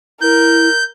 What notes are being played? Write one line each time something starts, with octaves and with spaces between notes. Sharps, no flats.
E4 A#4 G6